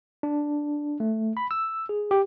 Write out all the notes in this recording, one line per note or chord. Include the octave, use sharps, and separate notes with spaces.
D4
A3
B5
E6
G#4
G4